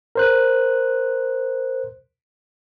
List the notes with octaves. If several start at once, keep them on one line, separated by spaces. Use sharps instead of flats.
A#4 C5 F#6